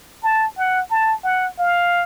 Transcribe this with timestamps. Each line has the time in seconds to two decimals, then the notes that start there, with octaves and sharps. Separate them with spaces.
0.23 A5
0.58 F#5
0.91 A5
1.24 F#5
1.59 F5